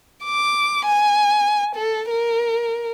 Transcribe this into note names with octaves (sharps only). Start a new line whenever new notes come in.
D6
G#5
A4
A#4